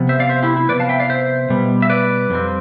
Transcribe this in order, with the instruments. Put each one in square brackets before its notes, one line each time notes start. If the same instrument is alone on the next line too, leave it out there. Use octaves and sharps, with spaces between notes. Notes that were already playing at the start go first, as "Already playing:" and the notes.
Already playing: [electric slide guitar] C3 F3 B3
C5 E5
D5 F5
C5 E5
E4 G4
E4
C3 F3 B3 B4 D5
F5 A5
E5 G5
D5 F5
C5 E5
B2 G3 B3
E5
B4 D5
F2 D3 G3 C4